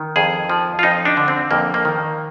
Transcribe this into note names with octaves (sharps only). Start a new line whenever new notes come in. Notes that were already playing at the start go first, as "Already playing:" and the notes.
Already playing: D#3
F2 G#4
F3
F4
F2 D#4
D4
D3
C4
F2 A#3
A#3
D#3